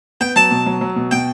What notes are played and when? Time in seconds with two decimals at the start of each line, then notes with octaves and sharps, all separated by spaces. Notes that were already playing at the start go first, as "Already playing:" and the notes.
0.21 B3 G5
0.36 F#3 A5
0.51 B2
0.66 F#3
0.81 F#3
0.96 B2
1.11 B2 G5